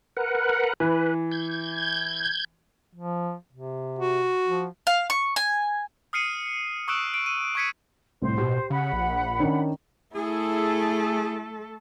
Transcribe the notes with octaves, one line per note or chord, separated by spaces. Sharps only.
A#4 B4 F#5
E3 B4
G6 G#6
F3
C3
F#4
F3
F5
C#6
G#5
D#6 F6 C7 C#7 D#7
C#6 D#6 E6 F#6 D7 E7
D7
D#7
C#6 D#6 G#6 B6 C#7 D#7
C2 A2 C5
B2 G4
C#3 F#5 B5
A#1
D#3 C#4 D4
A3 E4 G#4 A4